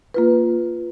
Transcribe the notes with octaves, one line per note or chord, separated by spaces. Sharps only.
A#3 F4 B4